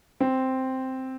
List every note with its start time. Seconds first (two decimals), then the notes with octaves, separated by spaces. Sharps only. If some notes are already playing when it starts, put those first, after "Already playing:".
0.20 C4